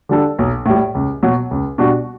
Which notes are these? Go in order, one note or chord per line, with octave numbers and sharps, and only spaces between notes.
D3 G3 D4 A4
B1
A2 G3
C#2
B2 F#3
C#2
B2 G3 D4 F#4